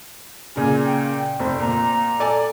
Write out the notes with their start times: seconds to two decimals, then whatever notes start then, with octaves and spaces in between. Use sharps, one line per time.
0.56 A#2 C#3 G#5
0.85 G5
1.39 F1 C5
1.60 A#2 A#5
2.20 A4 D5 G#5